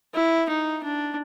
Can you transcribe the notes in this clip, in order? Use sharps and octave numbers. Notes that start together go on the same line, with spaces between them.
E4
D#4
D4